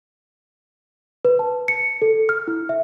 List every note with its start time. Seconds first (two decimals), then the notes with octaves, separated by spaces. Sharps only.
1.25 B4
1.39 A5
1.68 C#7
2.02 A4
2.29 F6
2.48 E4
2.69 E5